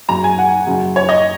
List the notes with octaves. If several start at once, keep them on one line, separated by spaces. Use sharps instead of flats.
F#1 F#2 C#3 A#5
G#5
F#5
F#1 F#2 C#3
C#5
D#5